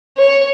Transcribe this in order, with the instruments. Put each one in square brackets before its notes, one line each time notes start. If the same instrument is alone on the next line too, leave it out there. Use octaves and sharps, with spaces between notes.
[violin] C#5